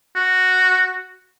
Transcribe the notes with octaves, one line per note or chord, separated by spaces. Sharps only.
F#4